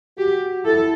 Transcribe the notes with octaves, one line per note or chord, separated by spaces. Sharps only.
F#4 G4
E4 A4